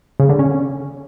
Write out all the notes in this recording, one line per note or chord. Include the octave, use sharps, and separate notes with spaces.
C#3
D3
C#4